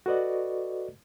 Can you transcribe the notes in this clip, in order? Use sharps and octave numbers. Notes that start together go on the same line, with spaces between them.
F#4 A4 B4 D5 D#5